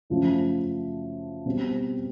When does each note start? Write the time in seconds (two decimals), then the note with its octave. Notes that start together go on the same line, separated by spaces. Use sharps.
0.10 F#2 C#3 F3 A3
1.45 B2 G3 C4